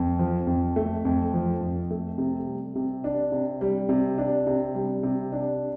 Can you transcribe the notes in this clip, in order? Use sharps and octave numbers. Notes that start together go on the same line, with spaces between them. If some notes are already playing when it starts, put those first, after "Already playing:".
Already playing: F2
F3
F2
A3
F2
F3
F2
A3
C3
G3
C3
D4
C3
G3
C3
D4
C3
G3
C3
D4